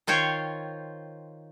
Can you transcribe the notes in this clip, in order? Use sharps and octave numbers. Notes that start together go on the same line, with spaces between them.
D#3 F4 C5 C#5 G5